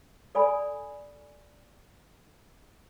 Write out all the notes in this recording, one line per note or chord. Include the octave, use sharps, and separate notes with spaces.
A4 D5 G#5 B5